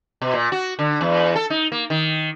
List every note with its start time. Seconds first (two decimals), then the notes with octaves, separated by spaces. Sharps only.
0.22 B2
0.34 A#2
0.52 F#4
0.79 D3
1.01 E2
1.36 A4
1.50 D#4
1.72 A#3
1.90 D#3